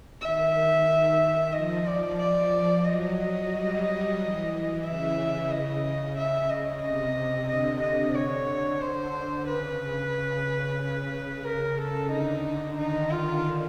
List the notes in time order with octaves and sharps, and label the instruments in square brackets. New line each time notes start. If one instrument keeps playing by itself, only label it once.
[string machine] D#3 [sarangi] E5
[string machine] F3 [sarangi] D#5
[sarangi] D5
D5
[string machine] F#3 [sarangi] D#5
[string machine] G3
E3
[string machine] C#3 [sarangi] E5
[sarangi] D#5
[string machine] C#3 [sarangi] E5
[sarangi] D#5
[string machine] C3 [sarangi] D#5
[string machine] D3 [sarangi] D#5
[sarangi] D#5
C#5
C5
[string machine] C#3 [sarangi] B4
[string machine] C#3
[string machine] C#3 [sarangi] A#4
[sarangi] A4
[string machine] D3 [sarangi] D#4
[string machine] D#3 [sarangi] D#4
[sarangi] F4